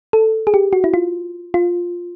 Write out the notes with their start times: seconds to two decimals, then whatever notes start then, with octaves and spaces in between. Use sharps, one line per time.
0.13 A4
0.47 G#4
0.54 G4
0.73 F#4
0.84 E4
0.94 F4
1.54 F4